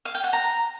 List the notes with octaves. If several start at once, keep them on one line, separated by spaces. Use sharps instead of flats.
F5
G5
F#5
A#5